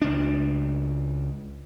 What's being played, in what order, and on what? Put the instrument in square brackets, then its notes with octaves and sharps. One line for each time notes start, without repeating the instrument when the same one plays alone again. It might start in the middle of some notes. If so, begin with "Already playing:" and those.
[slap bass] C#2 D4